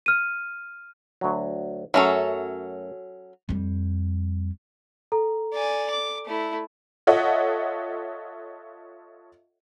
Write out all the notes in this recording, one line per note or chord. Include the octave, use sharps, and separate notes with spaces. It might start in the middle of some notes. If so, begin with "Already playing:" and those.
F6 D#7
D2 F#3
F#2 F#3 A3 C#4 A4
F2 G3
A4 A#5
D5 G#5
D6
A3 E4
F4 A4 C#5 D#5 E5 F#5